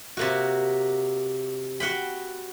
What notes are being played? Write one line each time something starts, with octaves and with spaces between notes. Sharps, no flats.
C3 A#3 F#4
F#4 F#5 G5 B5